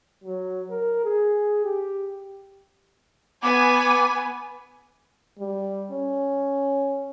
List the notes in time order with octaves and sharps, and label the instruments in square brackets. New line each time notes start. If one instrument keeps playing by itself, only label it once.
[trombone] F#3
A#4
G#4
G4
[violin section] B3 G#5 [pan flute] D6
[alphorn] G3
C#4